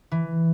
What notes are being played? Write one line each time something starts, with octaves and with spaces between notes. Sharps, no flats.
E3